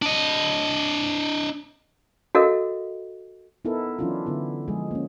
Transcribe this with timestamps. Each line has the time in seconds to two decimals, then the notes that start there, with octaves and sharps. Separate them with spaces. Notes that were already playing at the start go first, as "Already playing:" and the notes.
0.02 D4 D#5
2.35 F#4 A4 A#4 D#5 F5
3.65 B3 D#4 E4 A4 A#4
3.99 E3 F#3 C#4 D4 E4 F4
4.26 D3 B3 E4
4.68 F3 G#3 G#4
4.91 A#3 C#4